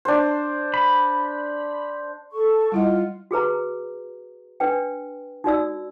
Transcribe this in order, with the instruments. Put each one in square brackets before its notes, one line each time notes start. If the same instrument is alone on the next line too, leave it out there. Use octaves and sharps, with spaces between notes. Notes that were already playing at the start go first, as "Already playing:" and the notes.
[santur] D4 C5
[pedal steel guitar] B5
[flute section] A4 C#6
[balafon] G3 E4 D#5 [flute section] F4 F#5
[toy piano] F#4 G#4 B4 A#5
D4 B4 G5
D#4 F#4 D5 E6